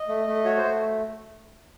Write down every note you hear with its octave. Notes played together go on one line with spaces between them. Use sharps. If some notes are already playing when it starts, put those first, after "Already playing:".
Already playing: D#5
A3
A3
F#4 C#5
C5
A3